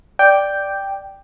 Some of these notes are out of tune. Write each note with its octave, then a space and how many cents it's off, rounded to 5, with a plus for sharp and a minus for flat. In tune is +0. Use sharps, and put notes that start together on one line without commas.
D5 +0 G5 +0